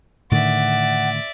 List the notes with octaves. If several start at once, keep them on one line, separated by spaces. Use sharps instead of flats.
A2 D3 D#3 D5 E5 F#5